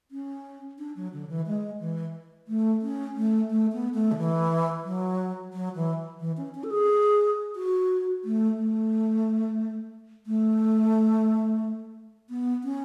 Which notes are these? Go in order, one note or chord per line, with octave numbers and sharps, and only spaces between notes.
C#4
D4
F#3
D3
E3
G#3
E3
A3
C#4
A3
A3
B3
A3
D3
E3
F#3
F#3
E3
E3
C#4
C#4
A4
G#4
F#4
A3
A3
A3
B3
C#4